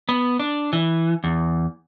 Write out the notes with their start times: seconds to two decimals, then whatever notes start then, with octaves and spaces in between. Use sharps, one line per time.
0.09 B3
0.39 D4
0.73 E3
1.24 E2